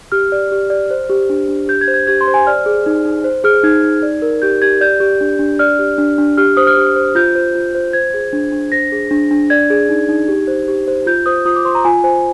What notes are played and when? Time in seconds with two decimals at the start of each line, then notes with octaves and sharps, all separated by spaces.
0.12 G4 F6
0.32 D5
0.52 G4
0.70 D5
0.91 C5
1.09 G4
1.30 D4
1.49 D4
1.68 G4 G6
1.81 G#6
1.88 C5
1.94 G#6
2.07 G4 G#6
2.21 C6
2.27 C5
2.34 G#5
2.47 D5 F6
2.66 G#4
2.86 D#4
3.05 D#4
3.24 C5
3.44 G#4 F6
3.63 D#4 G#6
3.83 D#4
4.03 D5
4.22 A#4
4.42 G4 G6
4.62 G4 G#6
4.81 D5 G6
5.00 G4
5.21 D4
5.39 D4
5.59 D5 F6
5.79 G4
5.98 D4
6.18 D4
6.38 G4 F6
6.57 C5 D#6
6.67 F6
6.77 G4
6.96 C5
7.15 F4 G6
7.35 C5
7.55 F4
7.75 C5
7.93 C5 G#6
8.14 G#4
8.33 D4
8.52 D4
8.72 C5 A#6
8.92 G#4
9.11 D4
9.31 D4
9.50 D5 G#6
9.70 G#4
9.89 D#4
10.09 D#4
10.28 G4
10.48 C5
10.68 G4
10.87 C5
11.06 F4 G6
11.26 C5 D#6
11.46 F4 D#6
11.56 D6
11.65 C5 C6
11.75 A#5
11.85 F4 G#5
12.04 C5 G#5